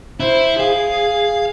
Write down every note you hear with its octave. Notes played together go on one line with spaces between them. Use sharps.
E4 C5
G#4 F5